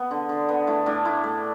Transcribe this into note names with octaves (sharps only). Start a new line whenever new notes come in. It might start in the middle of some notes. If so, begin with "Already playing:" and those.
Already playing: B3
D3
D3
B3
A3 E4
A2 D4
A2 E4
A3